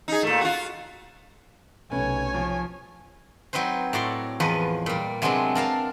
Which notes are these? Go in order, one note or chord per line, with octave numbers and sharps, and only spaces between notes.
D#4 G#4
A#2 A3
F4 F#4
B1 C3 A3 C#4 B4 C#5 G#5
F3
F#3 C4 D#4 B4 C5
A2 F#4 D5 C6
E2 F3 B4 D#5
A#2 G3
C3 F#3 G#3 B3 C4 D4
D4 A#4 F5 A5